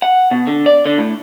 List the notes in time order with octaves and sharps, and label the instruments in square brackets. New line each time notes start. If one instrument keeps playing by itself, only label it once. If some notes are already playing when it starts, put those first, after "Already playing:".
[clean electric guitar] F#5
B2
D3
D5
D3
A2